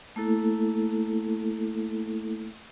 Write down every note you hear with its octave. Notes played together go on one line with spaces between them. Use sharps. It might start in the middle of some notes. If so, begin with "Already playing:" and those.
A3 A#3 E4 A4